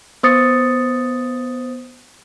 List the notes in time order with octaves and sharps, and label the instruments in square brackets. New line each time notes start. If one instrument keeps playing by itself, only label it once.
[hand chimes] B3 C5 D#6 A6 C#7